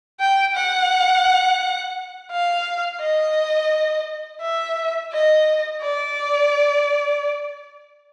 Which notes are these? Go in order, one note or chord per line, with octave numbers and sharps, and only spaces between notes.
G5
F#5
F5
D#5
E5
D#5
D5